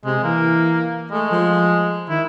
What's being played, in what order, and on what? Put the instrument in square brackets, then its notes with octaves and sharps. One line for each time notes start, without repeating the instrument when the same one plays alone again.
[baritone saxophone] C3 [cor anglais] G#3
[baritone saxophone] E3 [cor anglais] A#3
[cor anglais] G#3 [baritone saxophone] A3
[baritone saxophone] F3
[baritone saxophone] D#3 [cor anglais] E4